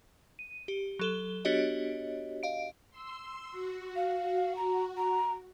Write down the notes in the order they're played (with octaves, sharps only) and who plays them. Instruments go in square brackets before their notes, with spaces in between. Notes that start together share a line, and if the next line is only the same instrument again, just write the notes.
[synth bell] D#7
G4
F#3 A4 G7
B3 D4 F#4 G4 C#5 D#5
D#5 F5 D7
[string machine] C6 E6
F#4
[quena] F5
A#5
A#5